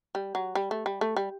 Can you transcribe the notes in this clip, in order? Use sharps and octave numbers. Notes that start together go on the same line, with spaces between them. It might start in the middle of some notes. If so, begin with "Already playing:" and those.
G3
F#3
G3
A3
G3
A3
G3